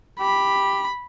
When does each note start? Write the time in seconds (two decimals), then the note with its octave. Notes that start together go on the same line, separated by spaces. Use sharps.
0.20 G4 B5